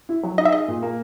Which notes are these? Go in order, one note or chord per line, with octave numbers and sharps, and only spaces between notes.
E4
F#3
D#4 D#5
E5
G#4 D#5
A#2
A#3